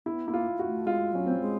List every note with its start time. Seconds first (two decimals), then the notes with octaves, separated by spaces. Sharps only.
0.06 B3 E4
0.26 A#3 E4
0.33 F4
0.59 F#4
0.67 A3
0.86 G#3 F4
1.13 F#3 C#4
1.26 C4
1.40 G#3